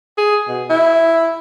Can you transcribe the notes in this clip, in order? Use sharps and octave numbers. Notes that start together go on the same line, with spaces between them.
G#4
B2
E4